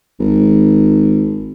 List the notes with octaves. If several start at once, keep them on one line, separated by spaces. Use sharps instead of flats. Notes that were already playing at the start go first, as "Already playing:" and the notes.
G#1